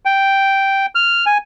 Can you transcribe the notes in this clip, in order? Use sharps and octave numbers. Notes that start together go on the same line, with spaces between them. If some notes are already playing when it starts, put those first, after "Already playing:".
G5
F6
G#5